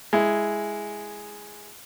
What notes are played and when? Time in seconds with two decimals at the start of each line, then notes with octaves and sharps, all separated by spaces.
0.13 G#3 E4